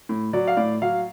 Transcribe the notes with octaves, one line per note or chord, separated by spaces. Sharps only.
A2
F#3 D5
F5
A2 D5
F#3 F5